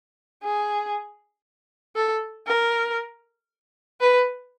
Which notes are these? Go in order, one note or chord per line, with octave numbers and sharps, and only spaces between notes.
G#4
A4
A#4
B4